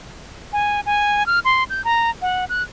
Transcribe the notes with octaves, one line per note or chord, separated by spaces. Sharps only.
G#5
G#5
F6
C6
G6
A#5
F#5
F#6